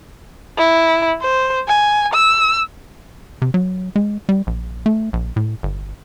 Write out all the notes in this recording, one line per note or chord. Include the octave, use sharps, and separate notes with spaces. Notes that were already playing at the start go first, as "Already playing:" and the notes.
E4
C5
G#5
E6
C3
F#3
G#3
G3
A#1
A3
A#1
A2
G1